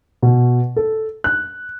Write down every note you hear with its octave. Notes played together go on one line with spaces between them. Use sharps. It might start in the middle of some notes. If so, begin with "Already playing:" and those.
B2
A4
F#6